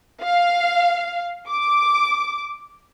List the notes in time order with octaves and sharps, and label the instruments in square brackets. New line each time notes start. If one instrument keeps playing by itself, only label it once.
[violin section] F5
D6